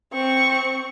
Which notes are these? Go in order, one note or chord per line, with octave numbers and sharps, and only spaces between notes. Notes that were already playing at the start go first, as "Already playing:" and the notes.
C4 C#6